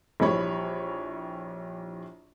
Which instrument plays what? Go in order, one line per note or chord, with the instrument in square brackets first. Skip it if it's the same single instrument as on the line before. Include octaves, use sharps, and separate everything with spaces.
[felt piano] A#1 E3 G3 C#5 B5